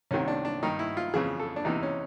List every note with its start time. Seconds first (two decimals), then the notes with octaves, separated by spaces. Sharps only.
0.11 C2 C3 D#3 C#4
0.28 D4
0.45 D4
0.63 G2 D#3 D#4
0.79 E4
0.97 F4
1.14 F2 C#3 E3 G#4
1.40 A4
1.56 D4
1.64 E2 C3 E3 D#4
1.83 C#4